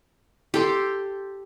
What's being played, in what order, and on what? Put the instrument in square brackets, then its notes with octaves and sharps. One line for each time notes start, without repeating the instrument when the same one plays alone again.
[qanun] G4 A4 G5 C6